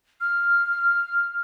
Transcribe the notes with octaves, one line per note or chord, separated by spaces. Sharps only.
F6